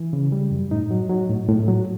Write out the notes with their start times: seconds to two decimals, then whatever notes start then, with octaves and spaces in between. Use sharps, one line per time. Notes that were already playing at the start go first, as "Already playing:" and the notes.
Already playing: E3
0.13 C#3
0.32 G3
0.51 F#2
0.71 A2 D#4
0.91 F#3
1.10 F#3
1.29 A2
1.49 A2
1.68 F#3